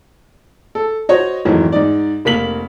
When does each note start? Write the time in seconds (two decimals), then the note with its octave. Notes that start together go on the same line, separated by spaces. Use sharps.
0.75 A4
1.09 F#4 C5 C#5 D#5
1.45 F2 G#2 D#3 E3 F#3
1.72 G#2 D#4 D5
2.25 F1 A#3 B6 F#7